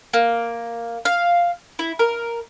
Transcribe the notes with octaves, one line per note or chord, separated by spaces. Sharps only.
A#3
F5
E4
A#4